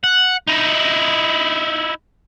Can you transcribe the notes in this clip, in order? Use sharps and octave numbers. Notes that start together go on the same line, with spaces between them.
F#5
D#4 E4